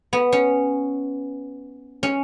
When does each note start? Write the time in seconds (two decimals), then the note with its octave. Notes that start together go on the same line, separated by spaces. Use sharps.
0.13 B3
0.32 C#4
2.03 C#4